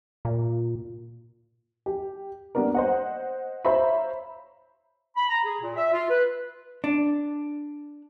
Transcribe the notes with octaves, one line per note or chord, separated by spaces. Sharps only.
A#2
G4
G3 A#3 B3 D4 A#4
C5 D#5 F#5
C5 C#5 E5 F5 A#5 B5
B5
A#5
G#4
A#2
E5
F4
B4
D4